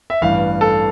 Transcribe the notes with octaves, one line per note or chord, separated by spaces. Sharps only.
E5
A1 G2 E3 F5
A4